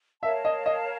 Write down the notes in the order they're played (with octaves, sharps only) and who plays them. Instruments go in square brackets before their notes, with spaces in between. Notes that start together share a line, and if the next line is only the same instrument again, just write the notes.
[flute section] A#4 C#5 F5 A5 [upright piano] E5
[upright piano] D#5
D#5